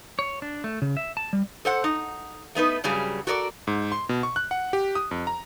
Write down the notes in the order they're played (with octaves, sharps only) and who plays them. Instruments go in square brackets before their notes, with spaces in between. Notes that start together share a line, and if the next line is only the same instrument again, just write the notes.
[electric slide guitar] C#5
D4
A3
C#3
E5
A5
G3
[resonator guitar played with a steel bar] A4 C5 F#5
D#4
A3 B3 D#4 B4
G2 C#3 F#3 G3 G#4
F#4 A4 A#4 C#5 D5
[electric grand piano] G#2
C6
B2
C#6
F#6
F#5
G4
D#6
F2
A#5